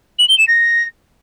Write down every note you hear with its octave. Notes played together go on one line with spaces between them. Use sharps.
F#7
G7
E7
A#6